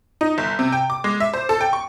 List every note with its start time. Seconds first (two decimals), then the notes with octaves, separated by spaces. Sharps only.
0.21 D#4
0.38 G1
0.59 C3
0.72 G5
0.90 D6
1.04 G#3
1.20 E5
1.34 C5
1.49 A4
1.61 G5
1.73 C#6